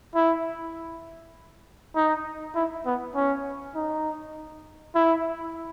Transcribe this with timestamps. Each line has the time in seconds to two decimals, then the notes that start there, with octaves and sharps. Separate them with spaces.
0.15 E4
1.96 D#4
2.55 E4
2.86 B3
3.15 C#4
3.75 D#4
4.95 E4